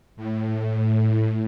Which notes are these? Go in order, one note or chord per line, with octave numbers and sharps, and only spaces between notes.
A2